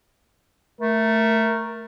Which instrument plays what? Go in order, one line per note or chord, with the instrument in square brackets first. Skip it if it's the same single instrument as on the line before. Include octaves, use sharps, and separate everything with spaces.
[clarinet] A3 [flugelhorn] A#4